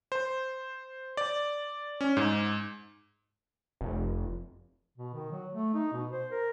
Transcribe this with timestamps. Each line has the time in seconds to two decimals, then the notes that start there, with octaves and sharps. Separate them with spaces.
0.12 C5
1.17 D5
2.01 C#4
2.17 G#2
3.81 F1
4.98 B2
5.14 D#3
5.32 F#3
5.52 A3
5.74 D#4
5.93 B2
6.12 C5
6.31 A#4